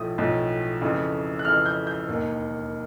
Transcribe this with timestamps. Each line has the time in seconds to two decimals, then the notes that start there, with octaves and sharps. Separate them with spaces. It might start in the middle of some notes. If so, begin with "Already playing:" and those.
Already playing: B1 A2 F3 A3 D#6
0.18 B1 A2 F3 A3
0.81 F2 C#3 E3 A3
1.39 F#6
1.45 F2 C#3 E3 A3 F6
1.66 G6
1.87 G6
2.08 E1 D#2 D#3